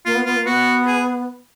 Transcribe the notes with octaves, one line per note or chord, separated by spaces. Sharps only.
A#3 F4
B3
B3 F4
A#3
B3 F#4
G#4